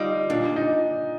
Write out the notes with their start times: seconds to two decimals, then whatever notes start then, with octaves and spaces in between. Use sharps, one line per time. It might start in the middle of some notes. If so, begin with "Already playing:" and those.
Already playing: G3 D#4 F4
0.30 A#2 D4
0.56 D#4